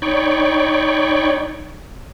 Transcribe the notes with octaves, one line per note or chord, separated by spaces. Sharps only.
D#4 C#5 D5 G5 B5 C#6